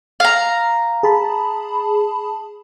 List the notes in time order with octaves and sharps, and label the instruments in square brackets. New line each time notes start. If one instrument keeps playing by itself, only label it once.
[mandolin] F5 A#5
[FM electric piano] G#4 A5 B5